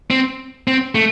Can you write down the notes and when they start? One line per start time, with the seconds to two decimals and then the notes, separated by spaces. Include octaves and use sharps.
0.10 C4
0.68 C4
0.95 A3